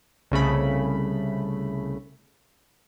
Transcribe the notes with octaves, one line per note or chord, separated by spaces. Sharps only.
C2 C#3 A3 B5